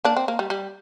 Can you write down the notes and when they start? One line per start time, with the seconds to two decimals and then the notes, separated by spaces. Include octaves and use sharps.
0.05 A#3 D4
0.17 C4
0.28 A#3
0.39 G3
0.50 G3